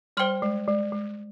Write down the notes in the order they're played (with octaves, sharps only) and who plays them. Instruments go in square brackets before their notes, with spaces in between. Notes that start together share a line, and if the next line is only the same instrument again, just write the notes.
[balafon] G3 [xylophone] C5 G5 C6 F6
[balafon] G#3
G#3
G#3